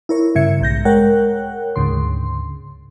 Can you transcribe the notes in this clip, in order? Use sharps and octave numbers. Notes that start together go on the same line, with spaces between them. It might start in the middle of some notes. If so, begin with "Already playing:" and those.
E4 A#4 C#5
G2 C#3 E5 G#6 C#7
B1 G#2 G6 A#6
G#3 A#4 C#5 F#5 G5 F#6
D2 G#2 C#3 C6